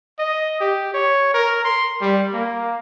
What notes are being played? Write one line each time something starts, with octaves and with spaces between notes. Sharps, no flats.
D#5
G4
C#5
A#4
C6
G3
A#3